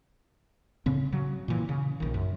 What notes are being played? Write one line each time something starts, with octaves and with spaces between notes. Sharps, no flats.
A2 C#3 C4
C#3 F#3
A#2 E3
C#3
A#1 D#3
F#2